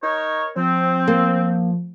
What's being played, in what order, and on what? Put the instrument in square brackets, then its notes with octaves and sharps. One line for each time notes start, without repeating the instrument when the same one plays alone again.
[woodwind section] D#4 A#4 C#5
[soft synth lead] F3 [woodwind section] C4
[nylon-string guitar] A#3